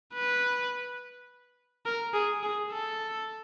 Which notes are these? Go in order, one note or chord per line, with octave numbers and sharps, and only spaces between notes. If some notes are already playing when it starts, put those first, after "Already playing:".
B4
A#4
G#4
G#4
A4